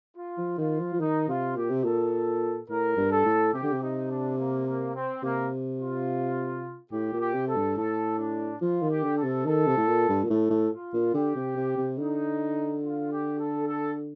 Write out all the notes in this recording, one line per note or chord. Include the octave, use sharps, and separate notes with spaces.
F4
F3
D#3 F4
F3
F3
D#3 D#4
C3 F4
A#2 G4
C3
A#2 A4
A2 A#4
G2
A4
A2
C3 G4
D3
C3
D#4
D4
A#3
A#3
C4
C3 A#3
F4
A2 G4
A#2
G4
C3
A4
G2
A2 A4
D4
F3 F4
D#3
G4
D3
A4
C3
D#3 A4
C3
A2
A#2
G2
A#2
A2 A4
A2
F4
A#2
D3 G4
C3
C3
C3
D3 D#4
F4
G4
A4
A4